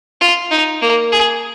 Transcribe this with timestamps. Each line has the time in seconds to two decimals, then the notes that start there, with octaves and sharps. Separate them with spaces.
0.21 F4
0.51 D#4
0.82 A#3
1.12 G#4